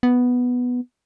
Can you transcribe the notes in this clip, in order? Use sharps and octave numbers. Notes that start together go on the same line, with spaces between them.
B3